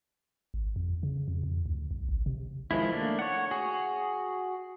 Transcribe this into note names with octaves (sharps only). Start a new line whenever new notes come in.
G#1
F2
C#3
F2
F2
D2
C2
G#1
C3
D#3 F3 G#3 E4
A3 A#3 D4
C#5 F#5
F#4 G#4